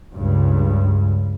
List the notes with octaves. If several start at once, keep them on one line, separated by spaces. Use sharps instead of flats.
C#2 G2